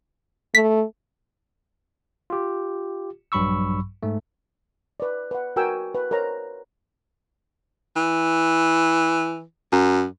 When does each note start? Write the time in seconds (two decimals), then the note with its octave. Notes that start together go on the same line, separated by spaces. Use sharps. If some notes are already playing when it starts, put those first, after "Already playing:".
0.55 A3 B6
2.30 F4 G4
3.32 A#1 G2 F#3 B5 C#6 E6
4.03 G#2 A3
5.00 B4 D5
5.31 B4 F#5
5.56 F#4 A#4 G5 G#5 E6
5.95 B4
6.11 A#4 C5 C#5 A#5
7.96 E3
9.72 F#2